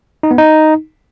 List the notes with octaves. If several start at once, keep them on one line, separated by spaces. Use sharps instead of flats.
D#4
B3
D#4